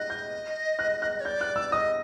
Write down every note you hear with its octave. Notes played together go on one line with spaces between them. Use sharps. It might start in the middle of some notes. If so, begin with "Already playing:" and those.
Already playing: D#5 F#6
G6
F#6
F#6
C#5
D5 G6
F#6
E6
D#5 D#6